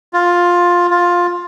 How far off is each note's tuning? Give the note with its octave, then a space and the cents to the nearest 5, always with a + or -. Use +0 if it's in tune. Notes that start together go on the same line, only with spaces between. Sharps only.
F4 +10
F4 +10